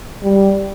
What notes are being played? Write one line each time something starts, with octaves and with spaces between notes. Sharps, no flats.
G3